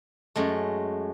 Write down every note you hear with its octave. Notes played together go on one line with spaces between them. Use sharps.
F#2 G#3 A3